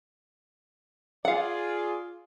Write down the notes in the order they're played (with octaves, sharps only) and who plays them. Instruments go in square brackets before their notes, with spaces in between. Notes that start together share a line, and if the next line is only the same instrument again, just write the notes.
[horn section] F4 G#4 D5 [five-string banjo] F5 F#5